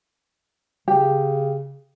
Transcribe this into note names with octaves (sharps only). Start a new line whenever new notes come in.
C#3 G4 G5